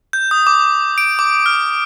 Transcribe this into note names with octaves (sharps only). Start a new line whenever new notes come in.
G6
D#6
D6
D7
D6
F6